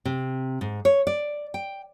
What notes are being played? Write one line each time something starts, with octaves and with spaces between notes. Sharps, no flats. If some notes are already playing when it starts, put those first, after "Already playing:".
C3
G#2
C#5
D5
G5